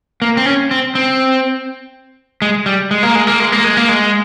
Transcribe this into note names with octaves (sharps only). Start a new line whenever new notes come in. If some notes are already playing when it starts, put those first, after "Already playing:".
A#3
C4
C#4
C4
C4
G#3
G3
G#3
A#3
G#3
A#3
G#3
A#3
G#3
A#3
G#3